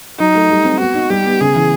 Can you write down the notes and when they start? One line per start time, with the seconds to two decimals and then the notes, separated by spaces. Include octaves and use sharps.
0.19 F#3 D#4
0.35 A3
0.50 G3
0.65 C4
0.79 B3 F#4
0.94 D#4
1.10 G3 G4
1.26 B3
1.41 C#3 G#4
1.56 E3